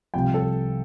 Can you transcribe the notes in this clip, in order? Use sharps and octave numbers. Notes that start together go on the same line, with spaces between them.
C2 C3 F3 G5
A4